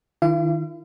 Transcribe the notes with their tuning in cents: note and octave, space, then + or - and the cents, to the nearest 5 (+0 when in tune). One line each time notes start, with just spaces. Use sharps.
D#3 +0 E4 +45 F5 -40